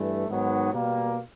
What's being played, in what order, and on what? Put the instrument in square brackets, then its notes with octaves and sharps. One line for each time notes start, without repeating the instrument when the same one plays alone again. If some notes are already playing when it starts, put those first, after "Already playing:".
Already playing: [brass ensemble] G2 E3 A3
G#2 D#3 F#3 B3
B2 G3 A#3